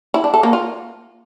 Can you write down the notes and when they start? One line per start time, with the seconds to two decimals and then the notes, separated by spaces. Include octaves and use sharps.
0.14 E4
0.24 D4
0.34 A4
0.43 A#3
0.53 F4